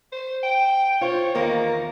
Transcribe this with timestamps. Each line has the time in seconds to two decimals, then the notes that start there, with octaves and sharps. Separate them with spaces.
0.12 C5
0.43 G5
1.01 F4 C5 C#5
1.35 E2 D#3 A#3 A#4